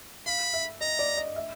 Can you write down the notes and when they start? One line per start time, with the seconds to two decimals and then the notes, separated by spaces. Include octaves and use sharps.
0.26 F5 B5
0.54 E5
0.81 D#5 A#5
0.99 D5
1.18 D#5
1.36 E5